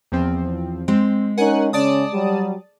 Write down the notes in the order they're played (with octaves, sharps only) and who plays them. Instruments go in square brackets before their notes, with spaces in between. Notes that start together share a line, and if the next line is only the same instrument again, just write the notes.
[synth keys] E2 F3 C4
[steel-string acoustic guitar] G#3 [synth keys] C4
[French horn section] C#4 D#4 A#4 [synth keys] F#5 G#5
[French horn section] C#3 C#4 [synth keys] D5 A5 D#6
[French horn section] F#3 G3